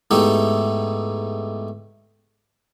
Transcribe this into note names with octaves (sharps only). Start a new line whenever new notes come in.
G#2 A3 B3 D#4 E4 G4